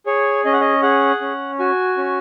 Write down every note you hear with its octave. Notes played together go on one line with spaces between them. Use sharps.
G#4 C#5
C#4 D#5
F#5
D#5
G#4 F#5
C#4
F#4 G#5
C#4